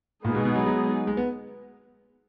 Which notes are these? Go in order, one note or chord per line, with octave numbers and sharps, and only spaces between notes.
A#2 G#3 B3 D#4 G#4
B2
B2
F#3
F#3
G#3
B3